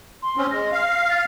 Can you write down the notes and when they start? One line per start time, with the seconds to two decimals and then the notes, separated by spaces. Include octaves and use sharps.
0.22 C6
0.37 C4 C#4
0.51 G#3 A#6
0.72 F5
1.10 A6